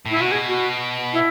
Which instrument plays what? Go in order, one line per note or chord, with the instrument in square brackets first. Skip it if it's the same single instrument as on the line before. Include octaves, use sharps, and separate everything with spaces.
[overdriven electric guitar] A2 [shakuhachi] E4
[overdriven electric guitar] B2
[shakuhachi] F#4
G#4
F#4
E4